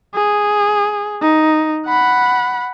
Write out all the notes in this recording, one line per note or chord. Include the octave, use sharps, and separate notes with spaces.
G#4
D#4
F#5 B5